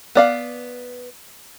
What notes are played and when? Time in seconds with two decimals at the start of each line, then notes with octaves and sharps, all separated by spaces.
0.15 B3 D5 F5